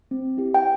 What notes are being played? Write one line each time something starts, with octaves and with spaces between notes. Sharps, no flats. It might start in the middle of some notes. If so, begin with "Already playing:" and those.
C4
E4 G4
G5